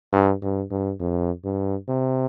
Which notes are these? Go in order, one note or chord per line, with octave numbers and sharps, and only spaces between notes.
G2
G2
G2
F2
G2
C3